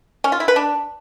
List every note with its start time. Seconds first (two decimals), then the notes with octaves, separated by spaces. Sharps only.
0.24 C#4
0.32 F4
0.40 E4
0.48 B4
0.56 D4